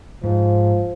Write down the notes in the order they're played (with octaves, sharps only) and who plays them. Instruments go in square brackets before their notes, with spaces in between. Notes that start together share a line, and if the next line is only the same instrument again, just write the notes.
[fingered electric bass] G#2 [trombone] F3